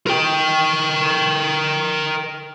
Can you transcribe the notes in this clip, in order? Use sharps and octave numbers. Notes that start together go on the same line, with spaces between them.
A#4 G5